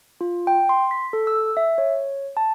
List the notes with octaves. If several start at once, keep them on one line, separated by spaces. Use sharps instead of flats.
F4
G5
C6
B6
A4
E6
E5
C#5
A5